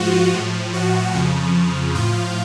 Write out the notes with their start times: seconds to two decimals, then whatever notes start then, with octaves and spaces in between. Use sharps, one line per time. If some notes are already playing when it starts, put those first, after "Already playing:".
Already playing: G#2 F3 F4 F#4
0.34 A2 F3
0.74 F#4
1.14 F2 C#3 F3
1.95 A2 F3 F4